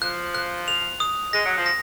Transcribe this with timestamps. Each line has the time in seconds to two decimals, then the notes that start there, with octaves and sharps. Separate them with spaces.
0.02 F3 F#6
0.35 F#6
0.68 F7
1.00 D#6
1.33 G#3 A#6
1.45 F#3
1.57 F3
1.66 A#6